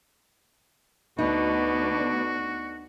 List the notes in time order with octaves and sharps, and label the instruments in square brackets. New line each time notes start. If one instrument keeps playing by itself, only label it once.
[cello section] D2 B3 D4 [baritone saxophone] B2 [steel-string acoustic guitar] D#4 [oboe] F#4